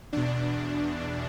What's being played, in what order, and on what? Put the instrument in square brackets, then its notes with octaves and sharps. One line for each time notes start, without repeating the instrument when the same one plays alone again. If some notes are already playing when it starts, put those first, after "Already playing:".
[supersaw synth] E2 B2 D4